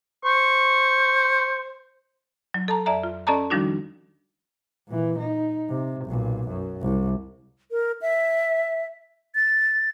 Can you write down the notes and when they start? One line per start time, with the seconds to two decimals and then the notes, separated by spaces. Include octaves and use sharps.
0.25 C5 C#6
2.54 F#3
2.68 A4 A5 A#5
2.86 F2 D5 E5 A#5
3.03 F4
3.27 C#4 A4 D5 D#5 A5 A#5
3.50 D#3 F3 G3 D4 D#4 F#4
4.88 A#2 E3
5.19 D#4
5.69 C3
6.05 B1 A#2
6.48 F#2
6.82 C2
7.71 A#4
8.01 E5
9.35 A6